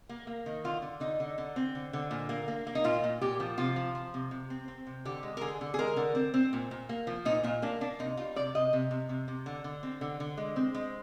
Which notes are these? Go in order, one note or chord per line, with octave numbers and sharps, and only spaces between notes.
A#3
A#3
D#3
D3 F4
D3
D3 D#4
D3
D3
C4
D3
D3
A#2
A#3
A#3
A#3
D#4
A#2 F4
A#2
A#2 G4
F3
C3 F4
F3
F3
C3
C3
C4
C4
C3
D3 G4
G#3
A#4
D3 G#4
D3
G#4
G#3 A#4
D3
C4
C4
A#2
A#2
A#3
F3
A#2 D#4
A#2 F4
A#3 D4
A#3 D4
C3 D#4
G3 F4
C3 D5
C3 D#5
C3
C3
C3
C3
D3
D3
C4
D3
D3
G#3
C4
G#3